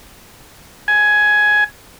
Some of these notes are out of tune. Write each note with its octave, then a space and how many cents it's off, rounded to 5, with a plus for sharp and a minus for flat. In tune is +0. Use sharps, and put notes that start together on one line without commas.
G#5 +15